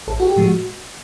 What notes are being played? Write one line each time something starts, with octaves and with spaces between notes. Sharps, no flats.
A1 A4
F#4
G4
A2 F3 G#3
F#4